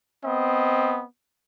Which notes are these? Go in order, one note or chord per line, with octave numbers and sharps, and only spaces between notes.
B3 C4 D#5